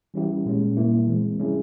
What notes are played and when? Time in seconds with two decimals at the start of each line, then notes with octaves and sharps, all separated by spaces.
0.14 E3 G3 C#4 E4 G4
0.46 A#2 G#3 C#4
0.77 A#2 G3 A#3 E4
1.07 E3 G#3 C4
1.39 C3 G3 C#4 E4 G#4